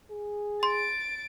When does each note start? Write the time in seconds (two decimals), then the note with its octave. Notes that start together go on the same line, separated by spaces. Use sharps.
0.11 G#4
0.63 C6 A6 D7